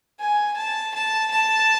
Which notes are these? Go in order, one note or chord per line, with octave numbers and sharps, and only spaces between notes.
G#5
A5
A5
A5